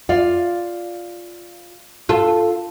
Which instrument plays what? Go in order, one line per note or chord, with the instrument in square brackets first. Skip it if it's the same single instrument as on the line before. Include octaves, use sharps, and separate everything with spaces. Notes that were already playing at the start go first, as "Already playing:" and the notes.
[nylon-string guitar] F4 D5 F5
[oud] F4 A4